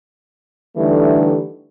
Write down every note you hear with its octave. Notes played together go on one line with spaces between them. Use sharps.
D3 E3 G3 A3 D#4